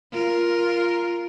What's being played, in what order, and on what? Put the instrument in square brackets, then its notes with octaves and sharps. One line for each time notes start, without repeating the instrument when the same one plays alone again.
[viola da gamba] F4 A#4